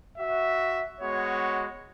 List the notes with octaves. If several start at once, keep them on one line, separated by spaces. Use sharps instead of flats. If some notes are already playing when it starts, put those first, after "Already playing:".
F#4 E5
G#3 B3 F#4 C#5